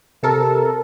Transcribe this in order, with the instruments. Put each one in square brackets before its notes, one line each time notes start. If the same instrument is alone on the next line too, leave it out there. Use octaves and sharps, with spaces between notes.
[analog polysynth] C3 A4 A#4